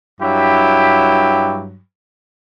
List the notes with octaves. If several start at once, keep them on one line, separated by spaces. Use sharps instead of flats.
G2 F#3 E4 G4